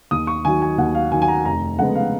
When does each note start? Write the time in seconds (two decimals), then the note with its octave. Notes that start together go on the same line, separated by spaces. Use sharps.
0.11 D#2 D#6
0.27 C#6
0.45 D#3 F#3 G#5
0.62 G#5
0.78 D#2 F#5
0.95 F5
1.12 D#3 F#3 G#5
1.22 G#5
1.28 A#5
1.45 F1 A#5
1.79 F2 C#3 G#3 B3 F#5
1.95 F5